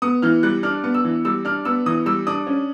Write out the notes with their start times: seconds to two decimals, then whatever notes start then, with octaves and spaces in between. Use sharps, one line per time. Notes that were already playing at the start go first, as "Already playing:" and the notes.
0.02 B3 D#6
0.22 E3 F6
0.43 G3 F#6
0.63 D4 F6
0.84 B3
0.94 E6
1.04 E3
1.25 G3 E6
1.45 D4 F6
1.65 B3 E6
1.86 E3 D#6
2.06 G3 E6
2.27 D4 D#6
2.47 C#4